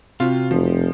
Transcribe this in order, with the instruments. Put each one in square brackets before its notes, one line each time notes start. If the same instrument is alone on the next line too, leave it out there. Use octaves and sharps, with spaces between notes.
[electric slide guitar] C3 [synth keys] C4 F#4 [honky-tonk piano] F4
[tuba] F1 [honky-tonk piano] F3